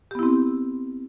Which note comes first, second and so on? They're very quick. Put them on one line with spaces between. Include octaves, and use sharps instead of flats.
G4 B3 E4 C4